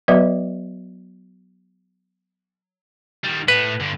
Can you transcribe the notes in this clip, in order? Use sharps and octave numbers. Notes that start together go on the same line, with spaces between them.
F#3 B3 F#4 B4 D#5 E5
D#3 G3
A2 B4
G2 D3